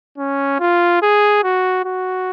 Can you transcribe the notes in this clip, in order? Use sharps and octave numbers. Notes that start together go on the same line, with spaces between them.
C#4
F4
G#4
F#4
F#4